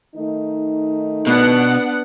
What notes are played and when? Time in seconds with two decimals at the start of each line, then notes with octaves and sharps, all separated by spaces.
0.15 D#3 A3 D#4
1.27 B2 B3 D4 F#5